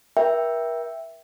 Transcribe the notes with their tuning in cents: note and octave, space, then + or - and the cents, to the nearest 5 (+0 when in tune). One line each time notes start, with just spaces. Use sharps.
A#4 +45 E5 +0 G5 +0